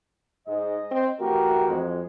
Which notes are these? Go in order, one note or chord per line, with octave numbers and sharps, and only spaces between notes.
G#2 D#5
C4
E3 A3 F#4 G4 A#4
F2 G#3